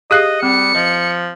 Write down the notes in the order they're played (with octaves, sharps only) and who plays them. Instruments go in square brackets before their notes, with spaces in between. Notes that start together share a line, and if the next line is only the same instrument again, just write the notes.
[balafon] G4 G#4 F5 [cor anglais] D#5 [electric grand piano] D#6 F#6 C7
[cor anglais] G3 [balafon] C4 [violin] C#7
[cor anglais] F3 [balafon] D#5